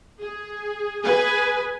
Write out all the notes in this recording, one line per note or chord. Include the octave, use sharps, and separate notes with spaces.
G#4
G#4 B4 G#5